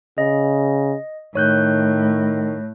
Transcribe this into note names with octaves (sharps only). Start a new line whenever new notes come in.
C#3 D#5
A2 D#3 C#5 F#6 G6